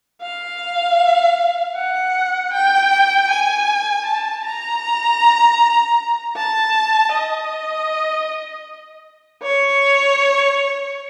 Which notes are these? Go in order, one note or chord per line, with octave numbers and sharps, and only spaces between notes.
F5
F#5
G5
G#5
A5
A#5
A5
D#5
C#5